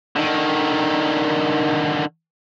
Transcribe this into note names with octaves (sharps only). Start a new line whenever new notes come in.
D3 D#3